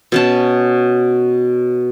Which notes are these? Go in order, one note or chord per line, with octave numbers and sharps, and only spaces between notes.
B2 C#4 A5